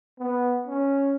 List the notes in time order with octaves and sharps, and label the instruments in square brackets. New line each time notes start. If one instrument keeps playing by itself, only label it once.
[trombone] B3
C#4